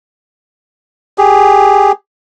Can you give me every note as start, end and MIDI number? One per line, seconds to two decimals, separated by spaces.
1.18 1.92 67
1.18 1.92 68